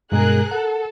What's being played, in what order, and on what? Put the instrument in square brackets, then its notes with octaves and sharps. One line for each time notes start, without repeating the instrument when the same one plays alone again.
[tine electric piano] G2 B2 G#3 [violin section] G#4 A#4 F#6
[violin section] A4 [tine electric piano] F#5